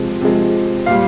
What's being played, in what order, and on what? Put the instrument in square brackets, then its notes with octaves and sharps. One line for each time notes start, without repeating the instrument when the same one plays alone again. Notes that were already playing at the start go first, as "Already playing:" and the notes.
Already playing: [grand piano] C3 F3 G#3
C3 F3 G#3
A#2 G3 F5